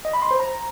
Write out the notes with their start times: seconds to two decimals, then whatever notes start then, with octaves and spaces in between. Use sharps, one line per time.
0.05 D#5
0.13 B5
0.22 C6
0.31 C5
0.39 A#5